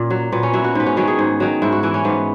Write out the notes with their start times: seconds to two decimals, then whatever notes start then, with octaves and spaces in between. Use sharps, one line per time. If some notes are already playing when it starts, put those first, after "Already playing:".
Already playing: A#2 A#3 C#4
0.10 F#3
0.32 A#2 B3
0.43 C#4
0.53 F#3 E4
0.64 F#4
0.75 G#2 B3
0.86 C#4
0.97 D#3 F#3 C#4
1.08 G#4
1.19 G#2
1.40 D#3 F#3
1.62 G#2 E4
1.72 F#4
1.83 E3 E4
1.94 C#4
2.05 G#2 B3